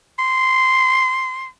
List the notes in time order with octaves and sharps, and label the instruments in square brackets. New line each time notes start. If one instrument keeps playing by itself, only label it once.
[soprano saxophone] C6